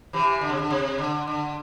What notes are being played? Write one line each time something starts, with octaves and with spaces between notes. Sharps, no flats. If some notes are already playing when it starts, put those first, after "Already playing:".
C3 E3
D3
C3
D3
C3
D3
D3